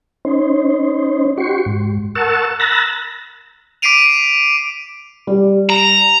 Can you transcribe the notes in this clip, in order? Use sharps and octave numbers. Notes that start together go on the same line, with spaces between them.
C#4 D#4 C5
F#4 G4 C6 C#6
G#2
A#4 F#5 A5 C#6 E6
A#5 B5 E6 F#6 A6 A#6
D6 B6 C7 D7 D#7 F7
G3
A#5